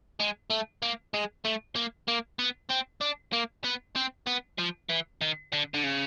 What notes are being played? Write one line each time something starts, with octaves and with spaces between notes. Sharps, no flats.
G#3
A3
A#3
G#3
A3
A#3
A#3
B3
C4
D4
A#3
B3
C4
B3
F3
E3
D#3
D3
D3
C#3